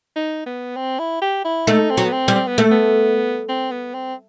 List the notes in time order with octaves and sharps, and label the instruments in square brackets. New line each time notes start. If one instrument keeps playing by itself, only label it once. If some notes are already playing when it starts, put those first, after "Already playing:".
[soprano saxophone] D#4
B3
C4
E4
G4
E4
[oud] A3 [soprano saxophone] D#4
[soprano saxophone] C4
[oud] F#3
[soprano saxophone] B3
C4
[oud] G3
[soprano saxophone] C4
B3
[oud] A3
[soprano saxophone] B3
C4
B3
C4